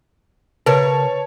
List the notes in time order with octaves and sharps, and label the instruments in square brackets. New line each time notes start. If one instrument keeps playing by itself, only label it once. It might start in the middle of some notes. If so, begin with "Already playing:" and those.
[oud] C#3 A#4 [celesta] B4 [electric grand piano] C#5 A5